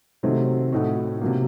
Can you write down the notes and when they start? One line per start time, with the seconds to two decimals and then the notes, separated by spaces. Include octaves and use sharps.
0.23 C3 D#3 F#3 A3 C4
0.72 A2 A3 D#4 F#4
1.21 C3 F#3 A#3